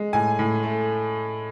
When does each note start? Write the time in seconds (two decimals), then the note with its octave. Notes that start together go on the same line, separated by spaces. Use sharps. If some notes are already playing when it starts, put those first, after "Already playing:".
Already playing: G#3
0.13 A2 G#5
0.39 A2
0.63 A3